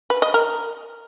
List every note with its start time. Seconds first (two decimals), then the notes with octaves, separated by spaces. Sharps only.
0.10 B4
0.22 D#5
0.34 A#4